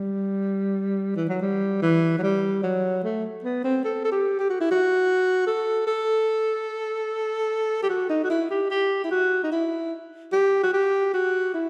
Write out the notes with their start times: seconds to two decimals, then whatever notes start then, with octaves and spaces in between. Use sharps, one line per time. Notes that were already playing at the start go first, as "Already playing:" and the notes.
Already playing: G3
1.17 E3
1.29 F#3
1.41 G3
1.82 E3
2.19 F#3
2.23 G3
2.63 F#3
3.04 A3
3.44 B3
3.64 C4
3.85 A4
4.05 A4
4.12 G4
4.39 G4
4.50 F#4
4.61 E4
4.71 F#4
5.47 A4
5.87 A4
7.83 G4
7.90 F#4
8.10 D#4
8.24 F#4
8.30 E4
8.51 G4
8.70 G4
9.04 E4
9.11 F#4
9.44 D#4
9.52 E4
10.33 G4
10.63 F#4
10.73 G4
11.14 F#4
11.54 E4